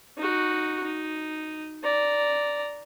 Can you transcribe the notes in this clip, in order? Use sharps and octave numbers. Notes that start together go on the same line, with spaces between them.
D#4 F#4
D#4
D5 A#5